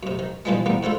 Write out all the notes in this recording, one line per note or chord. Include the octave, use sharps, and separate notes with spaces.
F#2 C3
D#3
G2 B2 E3 F3 G3 G#3
E3 G3 A#3 B3
G#2 D3 E4 F4